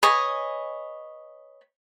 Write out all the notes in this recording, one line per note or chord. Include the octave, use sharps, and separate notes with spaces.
B4 C#5 D#5 G#5